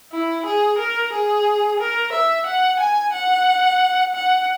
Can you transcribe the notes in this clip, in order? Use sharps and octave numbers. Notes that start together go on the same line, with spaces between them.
E4
G#4
A#4
G#4
A#4
E5
F#5
G#5
F#5
F#5